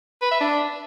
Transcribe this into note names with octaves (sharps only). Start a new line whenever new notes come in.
B4
E5
D4